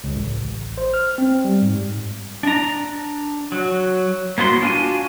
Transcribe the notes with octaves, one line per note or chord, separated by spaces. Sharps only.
C#2
A1
C5
F6
C4
G3
G#2
D4 A#5
F#3
A#3 B3 F#4 C6
D4 F4 F#4 G#5